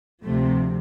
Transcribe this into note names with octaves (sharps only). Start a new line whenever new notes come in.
D2 C3 F3 A3